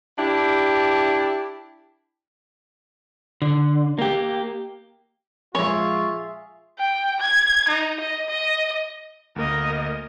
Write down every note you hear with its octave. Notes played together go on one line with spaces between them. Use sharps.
D4 E4 G4
D3
A#3 G4
A#1 G#3 F4 G#4 C#5 E5
G5
G#6
D#4
D#5
D#5
D2 A#3 A#4 D#5